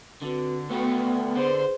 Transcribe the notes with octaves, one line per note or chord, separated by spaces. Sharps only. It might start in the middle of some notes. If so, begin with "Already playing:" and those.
D3 C4 F#4 B4
A3 B3 F#4 A4 F#5 G5
D3 G#4 B4 C5